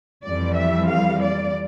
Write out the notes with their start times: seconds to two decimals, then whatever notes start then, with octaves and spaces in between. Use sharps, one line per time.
0.24 F2 E3 G3 D5
0.56 E5
0.88 F5
1.21 D5